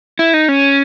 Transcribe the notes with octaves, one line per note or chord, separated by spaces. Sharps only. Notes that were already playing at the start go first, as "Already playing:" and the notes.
E4
D#4
C#4